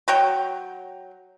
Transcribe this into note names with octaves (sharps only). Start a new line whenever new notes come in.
F#3 F#4 C#5 G5